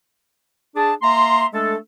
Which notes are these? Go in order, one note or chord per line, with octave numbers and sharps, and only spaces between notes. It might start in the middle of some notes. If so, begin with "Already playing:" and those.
D4 G#4 A5
A#3 E5 A#5 C6
G#3 A3 D4 A4